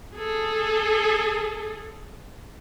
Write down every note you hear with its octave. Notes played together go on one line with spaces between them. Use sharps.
G#4 A4